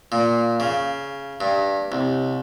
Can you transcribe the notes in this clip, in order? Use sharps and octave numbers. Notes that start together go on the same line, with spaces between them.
A#2
C#3
G2
C2